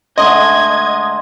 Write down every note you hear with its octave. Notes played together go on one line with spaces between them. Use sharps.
D3 G#3 A3 D#5 C6 G#6